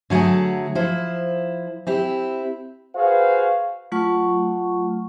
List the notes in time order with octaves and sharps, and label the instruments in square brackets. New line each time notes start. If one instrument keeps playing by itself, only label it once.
[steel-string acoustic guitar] D3 F#3 A3 F#4 G#4
F3 E4 C5
C4 E4 G4
[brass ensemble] F#4 G#4 B4 C5 F5
[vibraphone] F#3 A3 F4 F#5 C#6